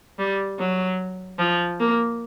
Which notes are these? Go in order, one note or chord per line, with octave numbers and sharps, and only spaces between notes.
G3
F#3
F3
A#3